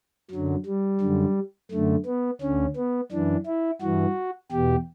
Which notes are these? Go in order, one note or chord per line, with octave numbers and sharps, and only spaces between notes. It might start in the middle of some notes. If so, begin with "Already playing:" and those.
F#2 D3 F#3
G3
F#2 D3
F#2 D3 A3
B3
D2 D3 C#4
B3
F#2 E3 D4
E4
G2 E3 F#4
E2 B2 G4